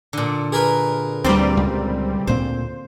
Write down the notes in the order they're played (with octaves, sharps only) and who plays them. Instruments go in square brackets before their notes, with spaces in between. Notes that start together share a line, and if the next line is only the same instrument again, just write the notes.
[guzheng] A#2 D3
[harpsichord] G#4 A#4 B4
[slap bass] D2 [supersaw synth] G3 C4 [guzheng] A#3 D5 C6
[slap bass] C#2
[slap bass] D2 A#2 C4 [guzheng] C5